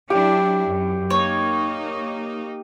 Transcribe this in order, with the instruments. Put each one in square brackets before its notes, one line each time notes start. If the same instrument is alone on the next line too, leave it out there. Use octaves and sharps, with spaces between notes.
[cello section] F#3 D4 E4 [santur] G4
[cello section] F#2
[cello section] A#3 D#4 [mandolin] C#5